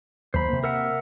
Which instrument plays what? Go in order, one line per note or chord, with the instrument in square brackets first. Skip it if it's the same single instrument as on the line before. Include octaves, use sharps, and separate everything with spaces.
[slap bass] D#2 F#3 [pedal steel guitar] C5 B5
[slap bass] C3 A#3
[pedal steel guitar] A#4 E5 F#5